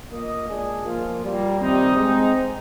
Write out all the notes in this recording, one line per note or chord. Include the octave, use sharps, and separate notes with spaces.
A#3 F4 A#4 D#5
A#2 G#3 D4 G#4
F3 A#3 F4
A#2 G3 A#3
C3 D#3 G3 C4 D#4
G#3 C4 D#4